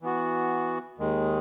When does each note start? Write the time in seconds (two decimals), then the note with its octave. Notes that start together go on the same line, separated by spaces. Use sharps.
0.02 E3 B3 F#4
0.98 D#2 D#3 G#3